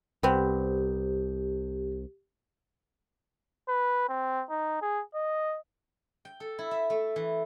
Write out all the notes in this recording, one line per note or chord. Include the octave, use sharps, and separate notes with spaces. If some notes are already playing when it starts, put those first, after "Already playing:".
C2 B3 C4 G4
B4
C4
D#4
G#4
D#5
G5
A4
E4
E5
A3
E3